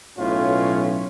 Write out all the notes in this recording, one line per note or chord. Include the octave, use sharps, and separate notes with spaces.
B1 A2 C#4 F4 C#5